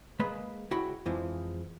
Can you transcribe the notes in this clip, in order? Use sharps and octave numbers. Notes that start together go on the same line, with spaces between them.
G#3 A#3 G#4 B4 B5
C#2 E4 F#4 G5 B5
F2 E3 F3 G#3